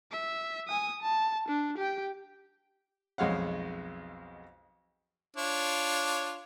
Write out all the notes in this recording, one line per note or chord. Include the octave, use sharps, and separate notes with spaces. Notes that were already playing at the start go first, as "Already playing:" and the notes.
E5
G#5 D#6
A5
D4
G4 G5
B1 F2 G#3 C#5 F5 F#5
D4 F4 C#5